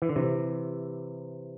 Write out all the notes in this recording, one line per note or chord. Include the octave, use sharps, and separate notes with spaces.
E3
D3
C3 E3